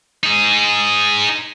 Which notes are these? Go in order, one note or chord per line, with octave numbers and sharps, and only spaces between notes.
D#4 G#4